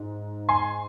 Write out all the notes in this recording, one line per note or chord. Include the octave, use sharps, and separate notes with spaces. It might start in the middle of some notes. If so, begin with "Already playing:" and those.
Already playing: G#2
G#5 C6